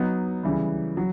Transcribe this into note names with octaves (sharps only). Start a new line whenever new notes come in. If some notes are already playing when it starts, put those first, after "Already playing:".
Already playing: F#3 B3 D#4
C#3 E3 G3
F#3